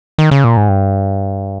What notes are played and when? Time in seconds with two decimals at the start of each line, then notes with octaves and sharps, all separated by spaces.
0.18 D#3
0.31 C#3
0.44 A#2
0.57 G#2
0.69 G2